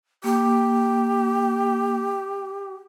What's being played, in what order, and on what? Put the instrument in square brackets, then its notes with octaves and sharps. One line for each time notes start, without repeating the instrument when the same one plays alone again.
[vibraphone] A#3 [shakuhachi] G4